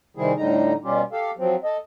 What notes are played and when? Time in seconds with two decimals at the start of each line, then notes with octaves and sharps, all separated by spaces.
0.17 C3 D#3 G3 C4 E4 G#4
0.37 A2 D3 G3 D#4 A#5
0.84 B2 G3 C#4 F4 G4
1.12 G4 A4 F5
1.38 F3 F#3 C4
1.64 A4 D#5